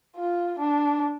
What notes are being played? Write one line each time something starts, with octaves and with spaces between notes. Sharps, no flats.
F4
D4